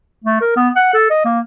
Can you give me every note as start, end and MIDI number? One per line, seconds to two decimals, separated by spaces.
0.24 0.40 57
0.41 0.52 70
0.56 0.69 59
0.76 0.93 78
0.94 1.06 69
1.10 1.25 75
1.25 1.40 58